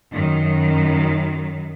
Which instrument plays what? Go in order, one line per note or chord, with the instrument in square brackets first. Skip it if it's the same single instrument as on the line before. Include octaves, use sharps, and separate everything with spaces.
[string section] F#2 D#3